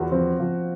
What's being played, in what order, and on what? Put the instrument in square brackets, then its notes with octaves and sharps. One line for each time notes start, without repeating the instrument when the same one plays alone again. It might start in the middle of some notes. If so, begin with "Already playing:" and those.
Already playing: [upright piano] E2 [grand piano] F4 F#4
[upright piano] F3 [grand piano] C4
[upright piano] F3